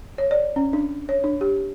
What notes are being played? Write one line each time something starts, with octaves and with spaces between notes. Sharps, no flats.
C#5
D5
C#4
D4
C#5
D4
G4